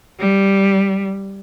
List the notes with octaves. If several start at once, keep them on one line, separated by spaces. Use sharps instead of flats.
G3